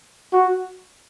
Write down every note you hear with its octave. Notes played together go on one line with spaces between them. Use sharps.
F#4